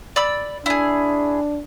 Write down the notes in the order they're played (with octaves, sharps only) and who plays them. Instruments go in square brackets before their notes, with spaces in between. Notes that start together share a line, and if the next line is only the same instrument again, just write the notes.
[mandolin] D5 B5 E6
[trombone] D4 [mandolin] E4 G#4